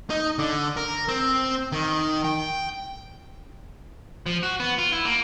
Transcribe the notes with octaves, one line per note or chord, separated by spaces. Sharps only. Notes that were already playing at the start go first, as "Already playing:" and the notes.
D#4
D3
A#4
C4
D#3
G5
F3
F#4
B3
F4
E4
A#3